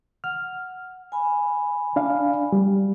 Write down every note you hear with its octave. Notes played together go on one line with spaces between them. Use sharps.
F#5 F6
G#5 B5
D4 F5
G3